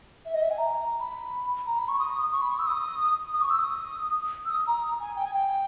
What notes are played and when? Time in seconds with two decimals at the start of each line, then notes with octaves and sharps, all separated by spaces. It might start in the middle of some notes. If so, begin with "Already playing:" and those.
0.26 E5
0.34 D#5
0.42 E5
0.51 G#5
0.58 A#5
1.00 B5
1.66 A#5
1.79 B5
1.88 C#6
2.00 D#6
2.33 C#6
2.42 B5
2.51 C#6
2.59 E6
2.67 D#6
3.34 D#6
3.42 C#6
3.50 E6
3.59 D#6
4.45 E6
4.50 D#6
4.67 A#5
5.00 G#5
5.16 G5
5.25 G#5
5.34 G5